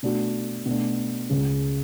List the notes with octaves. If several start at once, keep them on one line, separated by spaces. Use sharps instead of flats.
B2 A3 D4 F#4
B2 A3 D4
C#2 C#3 G#3 C#4